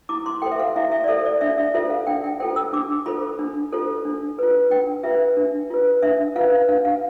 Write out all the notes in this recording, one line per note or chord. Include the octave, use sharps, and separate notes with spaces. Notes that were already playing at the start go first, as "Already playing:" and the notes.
E4 D6
C6
A4 C5 G5
E5
F5
E4 E5
E5
D5
A4 C5 E5
D5
D4 E5
E5
F4 A4 C5 E5
F5
D4 G5
G5
F4 A4 C5 G5
E6
D4 D6
F4 A4 C5 B5
D4
F4 A4 C5
D4
F4 B4
D4 G5
F4 B4 E5
D4
F4 B4
D4 E5
F4 B4 F5
D4 F5
F5